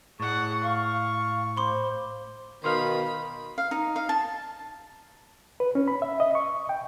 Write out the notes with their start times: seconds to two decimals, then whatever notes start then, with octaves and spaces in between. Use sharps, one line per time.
0.20 A2 G#4 F#5 C#6
0.63 F5 C#6
1.57 C5 B5 C6 D6
2.64 B2 D#3 C5 D#5 F5 B5
3.58 F5
3.71 D#4
3.96 F5
4.09 A5
5.60 B4
5.75 C#4
5.88 B5
6.02 E5
6.20 D#5
6.35 C#6
6.69 G5